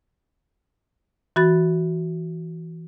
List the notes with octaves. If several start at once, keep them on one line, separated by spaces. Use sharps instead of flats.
E3 F#4 B5 A6